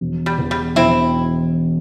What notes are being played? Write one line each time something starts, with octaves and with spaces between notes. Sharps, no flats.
E1
G3
E2
G3
E1 C4 E4